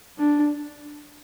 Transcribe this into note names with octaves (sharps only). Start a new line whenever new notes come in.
D4